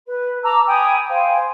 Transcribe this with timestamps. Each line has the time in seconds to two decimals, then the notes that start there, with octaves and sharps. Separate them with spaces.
0.06 B4
0.43 A5 A#5 D6 E6
0.67 G5 G#5 B5 D#6
1.09 C5 F5 G5 G#5